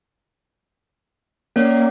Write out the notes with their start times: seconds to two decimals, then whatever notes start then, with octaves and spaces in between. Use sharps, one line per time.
1.56 A#3 C#4 C#5 D5